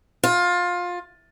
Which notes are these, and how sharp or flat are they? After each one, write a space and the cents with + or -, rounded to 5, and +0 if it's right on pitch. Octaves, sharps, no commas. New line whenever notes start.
F4 +20